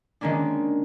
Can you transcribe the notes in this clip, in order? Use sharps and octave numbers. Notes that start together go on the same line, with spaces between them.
D#3 G#3 A#3 C#4 D4